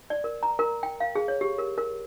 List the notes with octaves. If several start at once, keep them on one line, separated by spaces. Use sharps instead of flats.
D5
A#4
A#5
A#4
G5
F5
G#4
C#5
G4
A#4
A#4